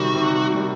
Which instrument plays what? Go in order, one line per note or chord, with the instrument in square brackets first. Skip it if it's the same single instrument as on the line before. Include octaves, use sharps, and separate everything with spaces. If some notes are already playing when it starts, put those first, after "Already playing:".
Already playing: [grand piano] C3 D#3 G3 [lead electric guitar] F#4
[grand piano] C3
D#3 G3